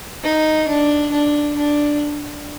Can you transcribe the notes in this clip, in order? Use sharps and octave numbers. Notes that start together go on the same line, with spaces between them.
D#4
D4
D4
D4